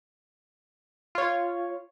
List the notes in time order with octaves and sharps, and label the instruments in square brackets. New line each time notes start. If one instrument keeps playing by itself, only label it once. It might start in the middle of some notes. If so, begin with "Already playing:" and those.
[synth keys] F4 C#5